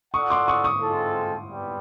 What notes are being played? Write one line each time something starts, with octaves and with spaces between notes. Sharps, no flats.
F4 A4 D5 F#5 C#6 D#6
C6 D6
C#6 D#6
C#6 D#6
G#3 C4 F4 A4
G3 B3